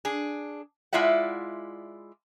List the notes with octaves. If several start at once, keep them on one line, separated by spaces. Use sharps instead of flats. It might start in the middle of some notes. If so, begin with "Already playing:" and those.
D4 G#4
G#3 E4 F4 D5 E5 F#5